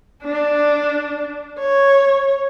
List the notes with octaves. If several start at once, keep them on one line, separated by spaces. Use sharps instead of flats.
D4
C#5